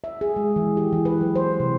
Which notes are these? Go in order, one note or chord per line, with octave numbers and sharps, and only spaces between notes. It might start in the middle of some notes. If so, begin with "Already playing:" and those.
E5
G#4
G#3
E3
G4
E3
B4
F#3
C5
C3